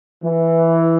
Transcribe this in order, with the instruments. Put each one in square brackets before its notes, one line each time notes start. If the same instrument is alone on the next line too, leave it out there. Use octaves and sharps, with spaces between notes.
[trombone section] E3